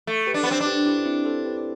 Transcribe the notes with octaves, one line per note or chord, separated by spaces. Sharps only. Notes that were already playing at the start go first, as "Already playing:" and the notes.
A3
G4 B4
D4
B3
C4 A4 C5
D4
G4 B4
E4 G4
C4 E4
A4 C5
G4 B4